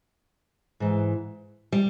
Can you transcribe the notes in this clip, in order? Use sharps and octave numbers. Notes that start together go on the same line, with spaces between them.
G#2 E3
G3